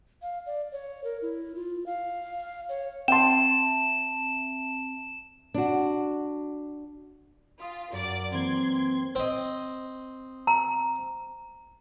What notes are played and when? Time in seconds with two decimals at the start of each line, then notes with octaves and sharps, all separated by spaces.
0.22 F5
0.46 D5
0.72 C#5
1.04 A#4
1.22 E4
1.56 F4
1.86 F5
2.69 C#5
3.08 C4 E5 G5 A5 C6 E7
5.54 D4 F#4
7.59 F4 G#5 D#6 B6
7.93 F#2 D5 D6
8.33 E3 A#3 C4 C6 G#6
9.15 C4 D#5
10.47 A#5